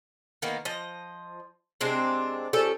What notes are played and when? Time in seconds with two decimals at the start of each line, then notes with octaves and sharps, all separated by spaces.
0.42 D#3 A#3 B3 D#4
0.65 F3 D#5
1.81 C3 G#3 C4 D4
2.53 F3 G3 C#4 A4